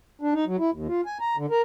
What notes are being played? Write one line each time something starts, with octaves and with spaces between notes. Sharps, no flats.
D4
D#4
F#3
E4
D#2
F4
G#5
A#5
D3
A#4